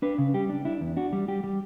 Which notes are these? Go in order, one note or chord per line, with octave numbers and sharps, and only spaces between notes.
D4 B4
C#3
G3 G4
D4
D4 E4
E2
D4 F#4
G3
G3 G4
G3